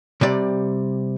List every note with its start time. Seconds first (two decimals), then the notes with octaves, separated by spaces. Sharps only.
0.21 C3 G3 D5